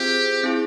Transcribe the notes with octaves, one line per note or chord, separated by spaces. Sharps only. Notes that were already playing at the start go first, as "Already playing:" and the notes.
Already playing: C4 F4 G4 G#4 C5
C4 E4 G#4